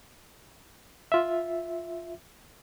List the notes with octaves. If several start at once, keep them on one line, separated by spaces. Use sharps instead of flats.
F4 E5